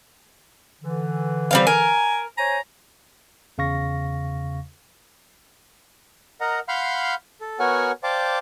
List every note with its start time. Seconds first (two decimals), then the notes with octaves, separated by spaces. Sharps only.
0.82 D3 E3
1.51 G3 C4 F5
1.67 A#4 G#5
2.38 C5 C#5 G#5 A#5
3.58 E2 C#3 F5 C#6 A#6
6.41 A#4 D#5 F#5 A#5
6.68 F5 F#5 B5 C6 F6 G6
7.41 A4
7.60 B3 F#4 A#4 C#5 F#5 G#5
8.03 C5 D5 F5 G5 A5 D6